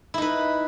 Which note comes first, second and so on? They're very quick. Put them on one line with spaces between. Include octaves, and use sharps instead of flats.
E4 D#4 B4